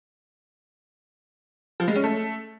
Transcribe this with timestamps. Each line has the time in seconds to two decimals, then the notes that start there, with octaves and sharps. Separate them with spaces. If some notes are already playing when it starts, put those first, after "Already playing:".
1.80 F3
1.88 G#3
1.96 C#4
2.04 A3